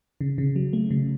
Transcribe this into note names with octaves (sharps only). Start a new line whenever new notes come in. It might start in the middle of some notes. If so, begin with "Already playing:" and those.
C#3
C#3
F#3
A3
C#3